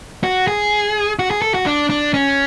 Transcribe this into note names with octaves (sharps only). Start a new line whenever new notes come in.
F#4
G#4
F#4
G#4
A4
F#4
D4
D4
C#4